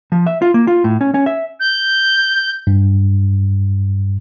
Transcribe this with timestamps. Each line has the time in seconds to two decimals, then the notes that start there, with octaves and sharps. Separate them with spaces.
0.12 F3
0.27 E5
0.42 F4
0.54 A#3
0.67 F4
0.84 A2
1.01 C#4
1.14 C#4
1.26 E5
1.60 G6
2.67 G2